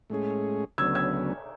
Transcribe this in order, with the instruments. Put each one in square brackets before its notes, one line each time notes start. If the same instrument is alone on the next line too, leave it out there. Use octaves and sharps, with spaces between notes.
[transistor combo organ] A2 G#3 C#4 G#4
[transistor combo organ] D2 C#3 F#3 B3 [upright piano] E6 G#6
[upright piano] E6 G#6